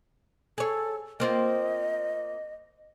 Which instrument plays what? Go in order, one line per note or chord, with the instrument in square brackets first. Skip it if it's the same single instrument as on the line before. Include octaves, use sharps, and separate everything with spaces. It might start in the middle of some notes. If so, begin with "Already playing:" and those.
[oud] G#4 C#5 [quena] A4
[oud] A#3 C4 F4 [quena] D#5